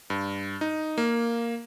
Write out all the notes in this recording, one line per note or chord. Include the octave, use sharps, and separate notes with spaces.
G2
D#4
A#3